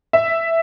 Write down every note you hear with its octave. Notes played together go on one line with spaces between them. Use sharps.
E5